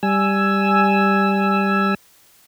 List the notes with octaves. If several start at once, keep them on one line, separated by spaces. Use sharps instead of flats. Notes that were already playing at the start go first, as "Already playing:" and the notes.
G3 G#5 E6